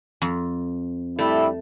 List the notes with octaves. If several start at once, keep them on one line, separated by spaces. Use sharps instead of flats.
F2
G3 A3 D4 E4